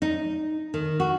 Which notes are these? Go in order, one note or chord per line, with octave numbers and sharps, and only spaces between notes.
D#4
D#3
F#4